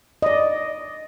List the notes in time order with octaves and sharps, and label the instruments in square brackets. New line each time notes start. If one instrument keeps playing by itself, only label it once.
[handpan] D5 D#5